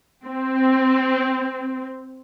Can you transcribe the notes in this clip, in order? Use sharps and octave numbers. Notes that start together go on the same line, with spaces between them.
C4